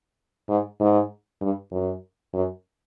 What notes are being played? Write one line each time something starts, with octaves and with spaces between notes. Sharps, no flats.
G#2
G#2
G2
F#2
F#2